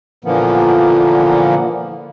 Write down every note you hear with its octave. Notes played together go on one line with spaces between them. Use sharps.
A#2 D3 E3 F3 A#3 B3